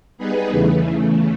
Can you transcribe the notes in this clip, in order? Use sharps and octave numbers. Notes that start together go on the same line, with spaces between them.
G3 B3 D#4 G#4 B4
E2 C#3 E3 A3